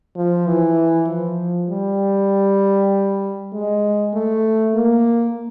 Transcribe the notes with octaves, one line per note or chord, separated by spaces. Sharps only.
F3
E3
F3
G3
G#3
A3
A#3